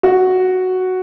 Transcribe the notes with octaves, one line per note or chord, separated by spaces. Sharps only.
F#4